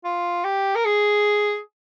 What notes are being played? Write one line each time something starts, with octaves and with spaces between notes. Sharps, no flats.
F4
G4
A#4
G#4